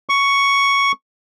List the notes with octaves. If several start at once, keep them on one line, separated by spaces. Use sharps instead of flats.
C#6